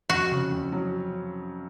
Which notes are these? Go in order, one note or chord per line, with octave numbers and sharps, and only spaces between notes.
F2 F#4
C#3
F2
F#3